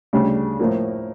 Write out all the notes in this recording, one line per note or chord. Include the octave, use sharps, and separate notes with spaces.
D2 C#3 G3 D4
A2 F3 A#3